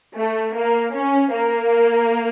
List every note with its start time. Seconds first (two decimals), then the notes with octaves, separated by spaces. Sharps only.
0.15 A3
0.54 A#3
0.93 C#4
1.31 A#3